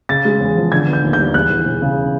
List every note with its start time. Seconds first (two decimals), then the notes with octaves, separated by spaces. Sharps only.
0.09 C#3 A6
0.25 G#3
0.40 E2
0.56 F3
0.72 D3 G#6
0.87 B3
0.93 G6
1.03 D#2
1.13 G6
1.19 G3
1.34 E2 F#6
1.50 E3
1.65 E1
1.82 C#3